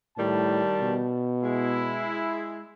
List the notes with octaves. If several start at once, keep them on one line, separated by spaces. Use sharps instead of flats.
A2 D#3 G3 A5
B2
G#3 E4